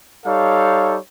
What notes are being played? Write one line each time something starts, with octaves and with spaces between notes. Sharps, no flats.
G3 D#4 A4 C#5 F5